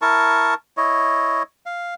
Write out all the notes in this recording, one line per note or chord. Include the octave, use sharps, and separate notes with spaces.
E4 A#4 A5 C#6
E4 C#5 D#5
F5